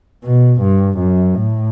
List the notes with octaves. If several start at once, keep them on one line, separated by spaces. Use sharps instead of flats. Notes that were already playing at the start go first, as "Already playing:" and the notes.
B2
G2
F#2
A2